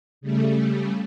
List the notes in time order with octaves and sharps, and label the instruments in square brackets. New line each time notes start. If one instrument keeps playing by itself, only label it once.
[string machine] C#3 G3 A3